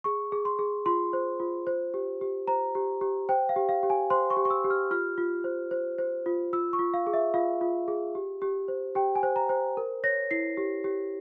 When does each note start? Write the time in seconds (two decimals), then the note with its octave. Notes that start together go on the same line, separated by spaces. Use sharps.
0.04 G#4 C#6
0.32 G#4
0.45 C6
0.59 G#4
0.86 F4 C6
1.13 C5
1.40 F4
1.67 C5
1.94 G4
2.21 G4
2.47 C5 A#5
2.75 G4
3.01 G4
3.29 C5 G5
3.49 F5
3.56 G4
3.69 F5
3.83 G4
3.90 G#5
4.10 C5 C6
4.30 C#6
4.37 G4
4.45 C#6
4.50 E6
4.64 G4
4.70 F6
4.91 F4 F6
5.18 F4
5.44 C5
5.71 C5
5.98 C5
6.26 F4
6.53 F4 E6
6.73 C#6
6.79 F4
6.94 F5
7.07 G#4
7.14 E5
7.34 F4 F5
7.61 F4
7.88 G#4
8.15 G4
8.42 G4
8.68 C5
8.95 G4 G5
9.15 G#5
9.23 C5
9.36 A#5
9.49 C5
9.77 A#4
10.04 C#5 A#6
10.31 E4 C7
10.57 G4
10.84 G4